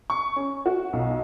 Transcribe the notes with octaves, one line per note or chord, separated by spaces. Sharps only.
C#6
C#4
F#4
B1